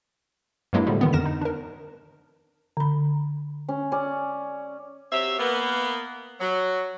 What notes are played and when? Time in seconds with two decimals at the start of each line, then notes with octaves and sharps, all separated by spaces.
0.73 G2 F#3 G#3 A#3 E4
0.86 A2 D3 F3 G3 A3
1.01 D3 D#3 B3
1.13 F2 A#4 A#6 E7
1.25 D#4
1.41 D4 A#4
2.77 D3 B5
3.69 C#4
3.92 C#4 D5
5.12 F#3 C4 G4 E5
5.39 A#3 B3
6.40 F#3